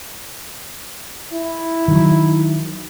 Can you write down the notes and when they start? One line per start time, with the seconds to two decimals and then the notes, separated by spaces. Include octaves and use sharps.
1.34 E4
1.88 D#3 F#3